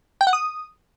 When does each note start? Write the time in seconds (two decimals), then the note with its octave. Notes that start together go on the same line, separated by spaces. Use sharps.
0.21 G5
0.27 F#5
0.33 D#6